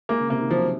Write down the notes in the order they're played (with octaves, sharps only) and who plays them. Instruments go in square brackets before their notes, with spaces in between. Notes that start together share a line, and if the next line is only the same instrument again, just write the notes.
[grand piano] G#3 [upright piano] A#3
[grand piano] C#3
[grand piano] C3 [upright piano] A#3
[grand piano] D#3
[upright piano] F3 [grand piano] F#3